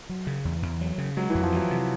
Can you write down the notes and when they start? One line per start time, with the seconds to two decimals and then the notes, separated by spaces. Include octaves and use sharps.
0.09 F#3
0.27 C#3
0.45 E2
0.62 E2
0.81 F#3
0.98 C#3
1.17 F#3 G#3
1.30 E3
1.35 F2
1.43 F3
1.52 E3 F#3
1.71 C3